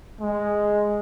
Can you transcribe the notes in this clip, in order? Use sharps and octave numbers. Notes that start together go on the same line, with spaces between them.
G#3